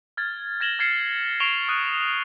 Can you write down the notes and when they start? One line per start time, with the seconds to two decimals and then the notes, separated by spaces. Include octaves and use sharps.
0.17 F6 G#6 A6
0.60 G#6 A#6 E7 F#7 G7
0.79 F6 G#6 A6 C7 C#7 E7
1.40 C#6 C7 D7 E7 F7 G7
1.68 D#6 F#6 D#7